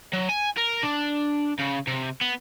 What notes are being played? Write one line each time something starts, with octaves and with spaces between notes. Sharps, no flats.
F#3
G#5
A#4
D4
C#3
C3
B3